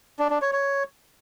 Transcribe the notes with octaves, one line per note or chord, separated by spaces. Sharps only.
D4
D4
C#5
C#5